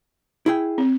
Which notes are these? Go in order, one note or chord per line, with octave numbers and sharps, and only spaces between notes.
E4 G#4 G5
C4